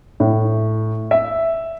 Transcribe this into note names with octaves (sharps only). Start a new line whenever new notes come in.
A2
E5